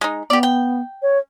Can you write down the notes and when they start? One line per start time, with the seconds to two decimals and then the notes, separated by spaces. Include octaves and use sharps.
0.01 G#3 D#4
0.30 B3 G4 D5
0.43 G5
1.02 C#5